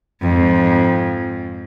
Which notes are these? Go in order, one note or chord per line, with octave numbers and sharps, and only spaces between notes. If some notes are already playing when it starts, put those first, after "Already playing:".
F2 G#2